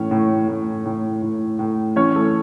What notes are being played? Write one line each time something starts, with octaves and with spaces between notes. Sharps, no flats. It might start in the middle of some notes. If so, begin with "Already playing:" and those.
Already playing: A2 E3 C#4 C#5
A2
A2
A2
A2
A2
E3 C#4 C#5
A3 A4